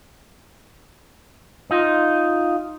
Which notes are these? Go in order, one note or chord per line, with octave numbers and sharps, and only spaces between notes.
D#4 F4